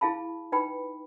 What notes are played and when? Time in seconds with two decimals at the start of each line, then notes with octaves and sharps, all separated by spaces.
0.01 E4 G#4 F5 A5 B5
0.52 D#4 B4 G5 B5